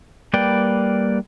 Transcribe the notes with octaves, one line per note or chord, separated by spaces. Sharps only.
G3 A#3 B4 D5 G5